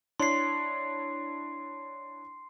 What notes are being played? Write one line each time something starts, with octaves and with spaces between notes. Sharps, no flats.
D4 E4 C#5 C6 C7